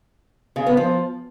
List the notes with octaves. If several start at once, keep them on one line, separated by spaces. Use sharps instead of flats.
C#3
B3
F3